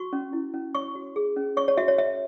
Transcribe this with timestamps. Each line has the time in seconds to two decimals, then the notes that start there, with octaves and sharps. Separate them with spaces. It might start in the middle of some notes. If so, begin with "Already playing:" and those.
Already playing: F#4 C#6
0.13 C#4
0.33 E4
0.54 C#4
0.74 C#5 C#6
0.95 F#4
1.16 G#4
1.37 C#4
1.57 C#5 C#6
1.68 C#5
1.77 F#4 E5
1.88 C#5
1.98 C#5 E5